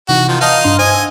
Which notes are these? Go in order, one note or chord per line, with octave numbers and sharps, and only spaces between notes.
C3 E3 D#4 F#4
D#3 F3
D#4 B4 D#5 F5 A5
G2 D4 C6
C5 D#5 G#5
F#5 D#6 E6